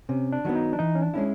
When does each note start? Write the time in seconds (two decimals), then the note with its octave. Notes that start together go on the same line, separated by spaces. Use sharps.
0.09 C3 C#4
0.32 D4
0.45 D#3 F#3 B3
0.56 D#4
0.73 D4
0.79 E3 D#4
0.95 C#4
1.02 D4
1.14 G#3 C#4 E4